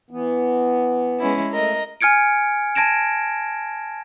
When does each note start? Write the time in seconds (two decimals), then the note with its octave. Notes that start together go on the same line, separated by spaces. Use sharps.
0.11 E3 B3
1.20 G#3 C#4 E4
1.52 A3 A#4 D#5 E5
2.01 G#5 F6 G#6 C#7 D7
2.75 A5 G#6 A#6 D7 E7